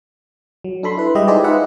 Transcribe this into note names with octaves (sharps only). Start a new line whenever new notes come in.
F#3
D4 A4 B5 C6
E4 B4
G3 G#3 G4 D#5 E5
D#4 F4 G#4 B4 C5 D5
D#4 B4 E5 F#5